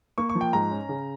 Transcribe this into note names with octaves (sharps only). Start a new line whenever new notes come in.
A#3 C#6
C#6
F3
G5
G#2 A#5
C#4
C#3